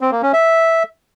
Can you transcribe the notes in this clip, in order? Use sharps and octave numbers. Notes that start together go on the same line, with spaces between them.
C4
A#3
C#4
E5